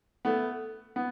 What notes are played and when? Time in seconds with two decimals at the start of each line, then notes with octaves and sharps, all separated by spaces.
0.25 A3 B3
0.96 B3